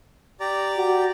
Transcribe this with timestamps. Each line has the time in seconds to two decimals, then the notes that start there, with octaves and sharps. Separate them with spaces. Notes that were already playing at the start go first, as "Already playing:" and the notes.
0.40 G4 D5 A#5
0.77 F#4